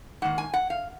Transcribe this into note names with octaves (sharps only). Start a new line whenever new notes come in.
G#2 D#3 A#3 F#5
G#5
F#5
F5